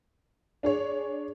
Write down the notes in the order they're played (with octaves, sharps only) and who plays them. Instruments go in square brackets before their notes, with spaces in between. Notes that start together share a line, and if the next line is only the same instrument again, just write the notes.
[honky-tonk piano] D4 G#4 C#5